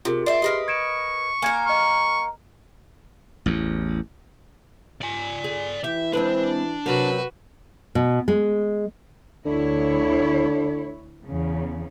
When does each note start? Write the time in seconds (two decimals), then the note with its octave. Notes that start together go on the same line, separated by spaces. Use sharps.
0.05 C3 F4 G#4 A#4
0.26 D5 E5 C6
0.42 G4 G#4 A#4 B4 D#5 E5
0.68 C#6 G#6 D7 E7
1.42 A#3 A#4 G#5 G#6 C#7
1.66 D#5 C#6 F6
3.46 A1 E2
5.02 D5 G#5
5.44 G#4
5.84 E3 G4 E5
6.13 G#3 C4 D4 B4
6.86 C3 F#3 F#4 A#4 B4
7.95 B2
8.28 G#3
9.45 D2 D3 E4 C#5
11.25 E2 C#3